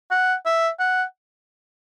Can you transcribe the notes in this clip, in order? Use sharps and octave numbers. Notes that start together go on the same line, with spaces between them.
F#5
E5
F#5